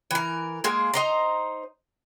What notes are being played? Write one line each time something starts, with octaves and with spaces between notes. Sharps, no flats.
E3 A#4
G#3 A#3 G#4
D#4 C5 A#5